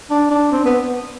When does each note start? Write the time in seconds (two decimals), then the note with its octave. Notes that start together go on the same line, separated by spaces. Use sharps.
0.11 D4
0.31 D4
0.52 C4
0.65 B3